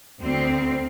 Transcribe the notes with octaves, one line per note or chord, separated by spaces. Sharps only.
D2 C4